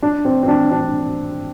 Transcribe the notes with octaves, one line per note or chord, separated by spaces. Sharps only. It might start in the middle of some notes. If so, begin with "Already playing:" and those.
D4
C4
C4
D4
D4